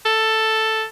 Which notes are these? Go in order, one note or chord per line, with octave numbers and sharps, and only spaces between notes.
A4